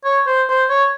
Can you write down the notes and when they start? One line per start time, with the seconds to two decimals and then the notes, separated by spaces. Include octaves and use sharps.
0.05 C#5
0.27 C5
0.49 C5
0.70 C#5